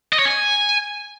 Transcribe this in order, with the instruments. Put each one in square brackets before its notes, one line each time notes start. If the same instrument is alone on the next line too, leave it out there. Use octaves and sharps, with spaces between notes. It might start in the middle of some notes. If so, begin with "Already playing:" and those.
[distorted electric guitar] D#5
C#5
G#5